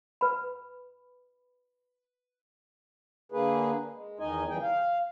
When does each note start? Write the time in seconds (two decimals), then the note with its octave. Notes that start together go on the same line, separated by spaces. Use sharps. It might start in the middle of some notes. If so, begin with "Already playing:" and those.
0.21 B4 B5
3.32 D3 A#3 G#4 B4
3.93 G#3
4.19 E2 D#3 D#4 D#5 G#5
4.49 C#3 E3 G3 G#4 G5
4.62 F5